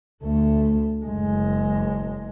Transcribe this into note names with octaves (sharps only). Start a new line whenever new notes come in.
D2 A3
F#1 G#3